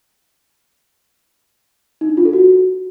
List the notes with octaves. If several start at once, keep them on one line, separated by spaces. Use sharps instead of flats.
D#4
D4
F4
A4
F#4